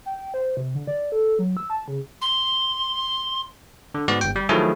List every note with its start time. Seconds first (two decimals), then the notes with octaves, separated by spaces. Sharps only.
0.06 G5
0.34 C5
0.57 C3
0.75 D3
0.87 D5
1.12 A4
1.39 F#3
1.57 E6
1.70 A5
1.88 C#3
2.22 C6
3.95 D3
4.08 G#2 B3 F#4 D5
4.21 G1 G5
4.36 G3
4.49 D#3 F3 F#3 A3 E4 G#4